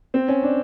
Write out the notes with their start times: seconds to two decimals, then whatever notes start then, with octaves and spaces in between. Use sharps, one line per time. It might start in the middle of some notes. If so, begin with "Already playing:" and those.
0.14 C4
0.28 C#4
0.43 D4